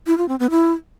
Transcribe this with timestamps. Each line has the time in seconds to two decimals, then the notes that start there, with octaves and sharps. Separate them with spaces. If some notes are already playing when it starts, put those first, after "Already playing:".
0.07 E4
0.18 F4
0.29 C4
0.40 B3
0.50 E4